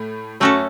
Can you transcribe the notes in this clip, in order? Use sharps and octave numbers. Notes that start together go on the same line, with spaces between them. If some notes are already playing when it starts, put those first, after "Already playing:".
Already playing: A2 A3
F#2 F#3 A3 C#4 F#4 A4